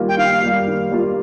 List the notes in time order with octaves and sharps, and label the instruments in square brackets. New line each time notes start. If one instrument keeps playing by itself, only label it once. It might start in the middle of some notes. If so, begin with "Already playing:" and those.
Already playing: [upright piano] D#3 G3 A#3 F4
[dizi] G5
[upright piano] D#3 [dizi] F5
[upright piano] G3 A#3 F4
D#3
G3 A#3 F4